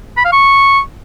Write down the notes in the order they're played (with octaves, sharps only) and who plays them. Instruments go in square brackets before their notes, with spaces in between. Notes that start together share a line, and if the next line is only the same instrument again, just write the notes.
[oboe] B5
F5
C#6